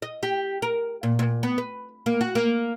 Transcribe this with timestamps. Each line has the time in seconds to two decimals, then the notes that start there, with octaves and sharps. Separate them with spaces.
0.02 D#5
0.23 G4
0.62 A#4
1.03 A#2
1.19 A#2
1.43 B3
1.58 B4
2.06 A#3
2.21 F#4
2.35 A#3